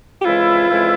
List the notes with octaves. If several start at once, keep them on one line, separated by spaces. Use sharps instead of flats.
G4
F2 C#3 E3 G#3 E4 F4
F2 C#3 E3 G#3 E4